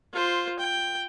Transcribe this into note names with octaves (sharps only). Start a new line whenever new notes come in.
F4 C5
G5